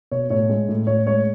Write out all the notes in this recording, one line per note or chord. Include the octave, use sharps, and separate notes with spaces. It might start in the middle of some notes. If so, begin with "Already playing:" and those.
B2 C#5
A2 C#5
G#3
A2
A2 C#5
G#3 C#5